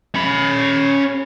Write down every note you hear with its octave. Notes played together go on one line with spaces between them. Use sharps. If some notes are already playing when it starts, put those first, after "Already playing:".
C#4 B5